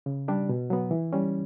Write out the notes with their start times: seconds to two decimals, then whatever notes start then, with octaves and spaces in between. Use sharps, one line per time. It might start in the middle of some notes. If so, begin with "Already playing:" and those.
0.06 C#3
0.28 G3 D4 G4
0.49 B2
0.70 F#3 B3
0.91 E3
1.13 G3 C#4